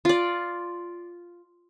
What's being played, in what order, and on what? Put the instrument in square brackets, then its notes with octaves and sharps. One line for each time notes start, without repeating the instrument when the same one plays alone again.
[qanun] F4 D5